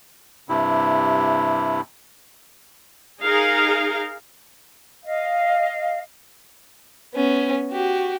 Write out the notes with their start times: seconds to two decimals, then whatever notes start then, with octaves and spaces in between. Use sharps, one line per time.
0.49 G2 C3 E4
3.23 D#4 G#4 A#4 F5
5.04 D#5 F5
7.14 B3 C#4
7.71 F#4 G4